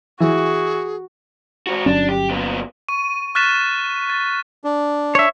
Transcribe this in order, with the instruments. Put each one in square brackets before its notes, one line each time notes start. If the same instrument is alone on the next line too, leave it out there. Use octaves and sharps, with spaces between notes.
[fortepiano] E3 [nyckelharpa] F#4 [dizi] G#4
[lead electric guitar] G#2 F#4
[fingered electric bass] G1 F#3 C#4 [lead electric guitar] D4
[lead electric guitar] G4
A#2 B3
[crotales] C#6 D#7
C#6 F6 F#6 A6 B6 E7
A6
[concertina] D4
[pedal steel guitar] C#5 E5